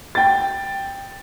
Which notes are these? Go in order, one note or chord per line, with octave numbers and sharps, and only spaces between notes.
G5 A6